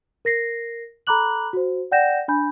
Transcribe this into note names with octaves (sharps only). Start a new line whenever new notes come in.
A#4 A#6 C7
A4 A#5 B5 D6 F#6 F#7
F#4 C5
D5 F#5 G5 G6 A#6 E7
D4 G#5 B5 G6